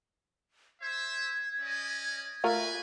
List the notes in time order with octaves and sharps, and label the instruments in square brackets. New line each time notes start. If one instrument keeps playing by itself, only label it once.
[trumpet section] C5 E5 [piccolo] G#6
[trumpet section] C#4 D5 D#5
[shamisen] A3 F4 A#4 [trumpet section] B4 D5 G#5